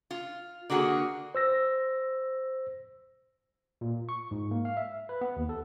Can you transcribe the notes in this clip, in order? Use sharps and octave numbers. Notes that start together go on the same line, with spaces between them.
F4
D3 A#3 F#4 G#4
C5 E6 A#6
A#2
C#6
G#2
A#3
F5
E5
B4
B3
D#2
A4